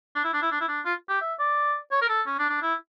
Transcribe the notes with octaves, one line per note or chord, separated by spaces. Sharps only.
D4
E4
D4
E4
D4
E4
D4
F4
G4
E5
D5
C#5
A#4
A4
C#4
D4
D4
E4